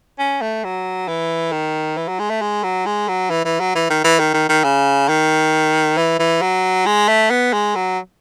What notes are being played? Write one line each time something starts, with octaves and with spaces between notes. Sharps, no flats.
C#4
A3
F#3
E3
D#3
E3
F#3
G#3
A3
G#3
F#3
G#3
F#3
E3
E3
F#3
E3
D#3
E3
D#3
D#3
D#3
C#3
D#3
E3
E3
F#3
G#3
A3
B3
G#3
F#3